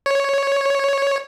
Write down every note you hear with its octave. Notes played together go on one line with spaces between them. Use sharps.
C#5